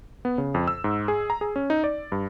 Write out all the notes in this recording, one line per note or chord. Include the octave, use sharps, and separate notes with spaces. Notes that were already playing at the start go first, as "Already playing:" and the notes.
B3
C#3
F2
E6
G#2
G#4
A#5
G#4
C#4
D#4
D5
G2